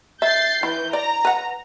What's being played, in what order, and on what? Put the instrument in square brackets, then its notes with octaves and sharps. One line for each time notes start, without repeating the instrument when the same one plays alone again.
[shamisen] E5 [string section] G6 A6 C7
[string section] E3 G6 [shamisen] E4
[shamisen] D5 [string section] A#5
[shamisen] B4 F#5